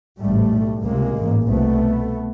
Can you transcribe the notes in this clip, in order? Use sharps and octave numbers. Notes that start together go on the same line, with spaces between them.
A1 G#2 G3 A3
B1 A2
C#2 C3 G#3 A#3
A1 G#2
C2 B2 A3 B3